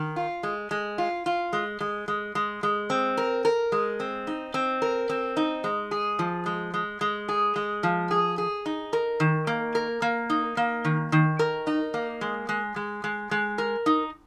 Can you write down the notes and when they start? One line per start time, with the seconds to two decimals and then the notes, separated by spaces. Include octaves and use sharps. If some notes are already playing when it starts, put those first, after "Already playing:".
Already playing: D#3
0.16 F4
0.43 G#3
0.71 G#3
0.98 F4
1.26 F4
1.53 G#3
1.80 G#3
2.08 G#3
2.35 G#3
2.63 G#3
2.90 C4
3.17 A#4
3.45 A#4
3.72 G#3
4.00 C4
4.27 D#4
4.54 C4
4.82 A#4
5.09 C4
5.37 D#4
5.64 G#3
5.91 G#4
6.19 F3
6.46 G#3
6.74 G#3
7.01 G#3
7.29 G#4
7.56 G#3
7.83 F3
8.11 G#4
8.38 G#4
8.66 D#4
8.93 A#4
9.20 D#3
9.47 A#3
9.75 A#4
10.02 A#3
10.30 D#4
10.57 A#3
10.85 D#3
11.12 D#3
11.39 A#4
11.67 D#4
11.94 A#3
12.21 G#3
12.49 G#3
12.76 G#3
13.04 G#3
13.31 G#3
13.58 A#4
13.86 D#4